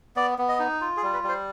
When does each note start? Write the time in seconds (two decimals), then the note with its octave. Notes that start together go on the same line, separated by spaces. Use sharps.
0.16 B3 D5
0.38 B3
0.49 D#5
0.59 D#4
0.81 F4
0.97 G#4
1.03 G3
1.13 B4
1.24 G3 C5